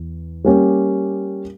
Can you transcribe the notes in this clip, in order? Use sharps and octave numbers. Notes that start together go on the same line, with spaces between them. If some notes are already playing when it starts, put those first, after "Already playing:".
Already playing: E2
G3 A#3 C#4 G4